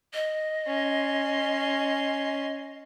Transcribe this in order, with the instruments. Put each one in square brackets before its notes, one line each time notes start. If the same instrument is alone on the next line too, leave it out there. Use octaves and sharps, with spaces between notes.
[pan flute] D#5
[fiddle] C#4 C6